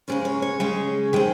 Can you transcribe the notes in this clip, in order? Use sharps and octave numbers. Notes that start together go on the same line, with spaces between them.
C#3 G#3 C#4 C5
C#5
C#5
C#3 G#3 C#4
D#3 G#3 C4